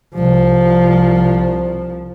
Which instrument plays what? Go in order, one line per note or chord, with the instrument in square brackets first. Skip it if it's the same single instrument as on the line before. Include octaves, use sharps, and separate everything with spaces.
[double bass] C2 F3